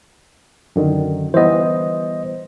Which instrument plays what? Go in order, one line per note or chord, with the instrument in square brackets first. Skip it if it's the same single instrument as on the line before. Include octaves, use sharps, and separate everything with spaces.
[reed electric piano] F#2 D3 D#3
[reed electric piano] E3 G3 B3 [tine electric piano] C5 D#5